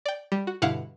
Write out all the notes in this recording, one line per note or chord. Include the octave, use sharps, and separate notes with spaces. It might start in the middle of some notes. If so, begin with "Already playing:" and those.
D5 G5
G3
F#4
G2 B2 D3 E4 F5 F#5